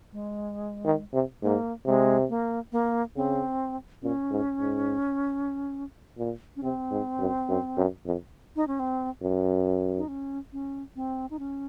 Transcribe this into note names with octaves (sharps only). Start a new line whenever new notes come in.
G#3
D#3
C3
G#2 A#3
C3 G#3
A#3
A#3
C#3 C4
A#2 C#4
G#2
G#2
A#2
C#4
C3 C4
G#2
F#2
F#2
F#2
F2
D#4
C#4
C4
F#2
D#4
C#4
C#4
C4
D#4
C#4